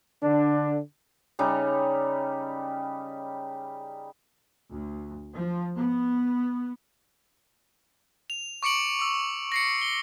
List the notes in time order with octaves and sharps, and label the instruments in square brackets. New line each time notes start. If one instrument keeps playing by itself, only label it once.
[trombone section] D3 D4
[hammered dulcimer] C#3 G3 D#4
[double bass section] D2
F3
B3
[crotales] F7
C#6 D6 C#7 D7 F#7
D6 E6
A#6 C7 C#7
G7